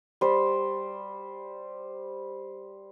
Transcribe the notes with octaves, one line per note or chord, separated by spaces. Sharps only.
G3 C5